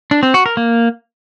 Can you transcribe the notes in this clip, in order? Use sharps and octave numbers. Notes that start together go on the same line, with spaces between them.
D4
C4
F#4
A#4
A#3